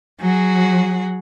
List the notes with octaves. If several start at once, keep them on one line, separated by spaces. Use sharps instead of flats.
F#3 F#4 G#4